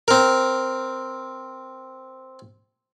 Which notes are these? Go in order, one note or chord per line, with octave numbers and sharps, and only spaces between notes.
C4 A#4